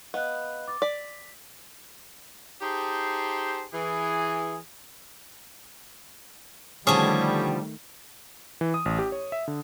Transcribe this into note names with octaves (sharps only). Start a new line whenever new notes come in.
B3 D#5 F5 F#6
D6 A6
D5 B6
D#4 G4 G#4 C5 A5
E3 G#4
D3 D#3 F3 G3 A3 C#4 G#4
E3
D#6
A1
G4
C#5
E5
D3